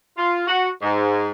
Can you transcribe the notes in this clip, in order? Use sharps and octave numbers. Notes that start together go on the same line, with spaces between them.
F4
F#4
G#2